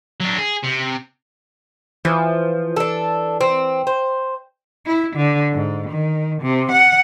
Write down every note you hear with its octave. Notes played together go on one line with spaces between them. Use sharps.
F#3 D4
G#4
C3
E3 F3
D4 A4
C4
C5
E4
D3
G#2
D#3
C3
F#5